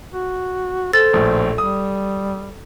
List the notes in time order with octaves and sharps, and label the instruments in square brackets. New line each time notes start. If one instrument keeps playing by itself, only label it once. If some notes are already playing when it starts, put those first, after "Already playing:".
[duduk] F#4
[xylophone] A4 A6 [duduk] C5
[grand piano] A#1 A2
[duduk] G3 [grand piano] D#6